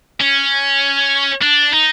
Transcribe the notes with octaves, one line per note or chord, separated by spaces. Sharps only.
C#4
D4
D#4